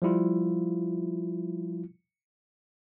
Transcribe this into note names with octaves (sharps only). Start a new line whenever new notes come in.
F3 G3 E4 F4